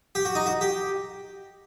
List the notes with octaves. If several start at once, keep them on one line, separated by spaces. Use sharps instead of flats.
G4
F#4
D#4
F#4
G4